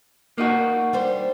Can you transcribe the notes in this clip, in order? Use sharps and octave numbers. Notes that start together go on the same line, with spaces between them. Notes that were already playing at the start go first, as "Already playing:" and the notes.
A#3 D#4 F#4
G3 D4 C5